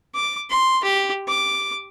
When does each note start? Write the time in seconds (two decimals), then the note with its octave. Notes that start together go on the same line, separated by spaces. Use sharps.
0.15 D6
0.50 C6
0.84 G4
1.28 D6